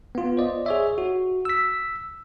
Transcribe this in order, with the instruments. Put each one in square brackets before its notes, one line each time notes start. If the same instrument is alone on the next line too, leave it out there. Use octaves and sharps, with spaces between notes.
[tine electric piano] B3 F4
C5 D5 D#5
G#4 C#5 E5
F#4
E6 B6